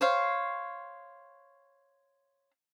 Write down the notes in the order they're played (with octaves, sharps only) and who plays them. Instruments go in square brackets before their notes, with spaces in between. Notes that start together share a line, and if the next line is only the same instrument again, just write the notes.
[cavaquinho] C5 C#5 F5